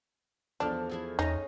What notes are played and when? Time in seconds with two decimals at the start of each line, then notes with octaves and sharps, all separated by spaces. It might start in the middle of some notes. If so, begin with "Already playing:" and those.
0.60 E2 F3 D4 A4 D5 F6
0.89 E4 G#4 A4
1.19 E2 C#4 D#4 G#4 D#5 A#5